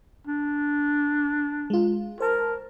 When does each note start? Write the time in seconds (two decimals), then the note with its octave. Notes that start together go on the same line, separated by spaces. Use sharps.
0.27 D4
1.70 G#3 F4
2.20 A#4 C5 A5